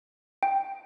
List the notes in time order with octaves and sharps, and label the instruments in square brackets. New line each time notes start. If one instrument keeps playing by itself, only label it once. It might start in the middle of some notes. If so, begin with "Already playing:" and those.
[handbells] G5